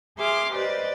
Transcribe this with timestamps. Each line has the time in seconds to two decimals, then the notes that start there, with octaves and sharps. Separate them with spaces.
0.18 G#4 E5 C6 D6 F6
0.53 G4 B4 C5 D5 D#5